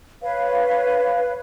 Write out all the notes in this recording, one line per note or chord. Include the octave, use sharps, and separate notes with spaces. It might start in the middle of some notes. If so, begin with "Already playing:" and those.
B4 C#5 F5